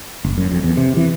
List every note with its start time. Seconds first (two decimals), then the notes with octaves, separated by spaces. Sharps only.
0.24 F#1
0.38 F#2
0.51 F2
0.63 E2
0.77 C3
0.97 E3